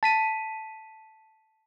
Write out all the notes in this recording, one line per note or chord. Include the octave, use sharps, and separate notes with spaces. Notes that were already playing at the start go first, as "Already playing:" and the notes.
A5 B6 D#7